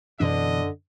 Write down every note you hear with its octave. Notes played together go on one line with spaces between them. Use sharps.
F#2 B2 D3 E3 D4 D#5